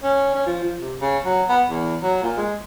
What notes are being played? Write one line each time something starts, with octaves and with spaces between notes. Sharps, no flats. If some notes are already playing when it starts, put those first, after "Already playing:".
C#4
C#4
F3
F3
C3
C#3
F#3
B3
E2
F#3
A#2
G#3